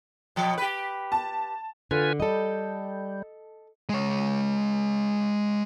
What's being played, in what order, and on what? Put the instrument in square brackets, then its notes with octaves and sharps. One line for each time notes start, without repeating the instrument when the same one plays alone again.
[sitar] B2 F3
G4 B4
[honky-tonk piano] A5
[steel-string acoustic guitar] D3 [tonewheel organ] F4 B4 G#5
[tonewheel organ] G3 [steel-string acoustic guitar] A4 D#5
[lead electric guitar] G#3 C#5